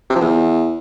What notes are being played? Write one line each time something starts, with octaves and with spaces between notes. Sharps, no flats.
C3
F3
E2